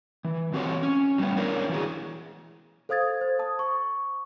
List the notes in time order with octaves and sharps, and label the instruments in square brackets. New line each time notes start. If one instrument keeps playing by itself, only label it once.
[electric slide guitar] E3
E3 C4 F#4 G4 A4 C#5
C#4
F#3 G3 A3 B3 C#4
D4 E4 A#4 C#5
E3 F#4 G#4
[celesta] A4 C5 F5 D#6 G#6 A6
C5
A5 D#6
C#6